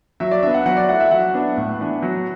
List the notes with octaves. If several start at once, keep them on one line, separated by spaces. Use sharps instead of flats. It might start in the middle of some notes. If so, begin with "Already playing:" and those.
F#3 E5
D5
B3 D4 E5
F#5
F#3 F#5
D5
A3 E4 F#5
E5
F#3 F#5
B3 D4
A2
E3 B3 D4
F#3